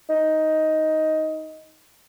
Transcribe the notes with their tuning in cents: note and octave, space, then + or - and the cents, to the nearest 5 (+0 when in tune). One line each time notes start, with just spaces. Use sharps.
D#4 +10